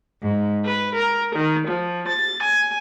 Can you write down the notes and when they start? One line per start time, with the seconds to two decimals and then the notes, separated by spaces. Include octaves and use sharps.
0.21 G#2
0.64 B4
0.95 A#4
1.35 D#3
1.67 F3
2.08 A6
2.43 G#5